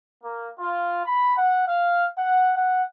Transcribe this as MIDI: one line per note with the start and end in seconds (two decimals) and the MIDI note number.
0.23 0.48 58
0.59 1.00 65
1.05 1.32 83
1.36 1.65 78
1.67 2.06 77
2.17 2.50 78
2.56 2.81 78